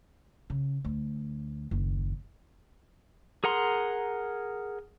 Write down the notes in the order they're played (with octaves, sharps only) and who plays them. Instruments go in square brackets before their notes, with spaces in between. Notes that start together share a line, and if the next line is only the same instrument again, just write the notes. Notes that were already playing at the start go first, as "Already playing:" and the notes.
[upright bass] C#3
D2
F#1 D#2
[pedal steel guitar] G#4 A#4 F#5 A#5 C6